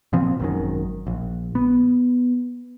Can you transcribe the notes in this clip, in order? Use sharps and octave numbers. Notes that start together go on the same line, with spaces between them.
A#2 F3 C4
G#1 F#2 D#3
A#1
B3